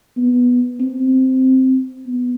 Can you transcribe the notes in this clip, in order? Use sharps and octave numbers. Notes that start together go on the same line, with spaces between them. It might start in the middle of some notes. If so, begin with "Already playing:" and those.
B3
C4
B3